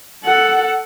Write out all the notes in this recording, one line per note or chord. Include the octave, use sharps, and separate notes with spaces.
A4 F#5